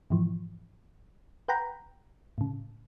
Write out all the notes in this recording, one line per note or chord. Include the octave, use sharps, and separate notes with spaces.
G#2 B2 E3 F3
B4 F#5 G5 A#5 B5
A2 C#3